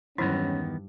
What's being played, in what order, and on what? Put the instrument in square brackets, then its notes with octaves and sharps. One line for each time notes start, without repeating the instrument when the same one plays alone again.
[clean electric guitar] E2 D#3 B3 [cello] G2 [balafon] F#3 D#4 E4 [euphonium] C#4